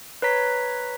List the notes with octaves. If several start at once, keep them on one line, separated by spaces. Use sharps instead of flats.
B4 C#5 A#5 B6